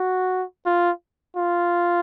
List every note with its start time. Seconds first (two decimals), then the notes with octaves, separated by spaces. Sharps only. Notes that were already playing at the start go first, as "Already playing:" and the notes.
Already playing: F#4
0.66 F4
1.37 F4